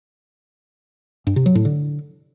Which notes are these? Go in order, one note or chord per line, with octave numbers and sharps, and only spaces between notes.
G2
C3
F#3
A2
D3